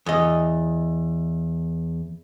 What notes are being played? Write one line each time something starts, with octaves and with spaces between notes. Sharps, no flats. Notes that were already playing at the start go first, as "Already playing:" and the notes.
E2 D#5